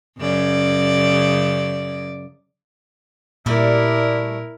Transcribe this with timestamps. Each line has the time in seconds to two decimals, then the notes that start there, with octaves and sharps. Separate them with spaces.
0.18 F#2 C#3 D5
3.46 A#2 G3 A3 E4 A#4 D5